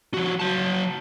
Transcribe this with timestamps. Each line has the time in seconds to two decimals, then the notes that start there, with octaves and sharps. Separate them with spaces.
0.14 F3 F#4
0.40 F#3 A5